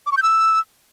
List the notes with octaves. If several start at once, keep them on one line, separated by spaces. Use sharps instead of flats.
D6
C#6
G6
E6